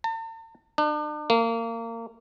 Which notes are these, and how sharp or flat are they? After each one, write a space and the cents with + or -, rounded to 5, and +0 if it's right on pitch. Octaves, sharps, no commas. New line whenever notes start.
A5 +45
D4 +40
A#3 -25